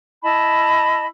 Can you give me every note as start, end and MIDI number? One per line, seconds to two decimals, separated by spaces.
0.23 1.06 64
0.23 1.06 75
0.23 1.06 81
0.23 1.06 83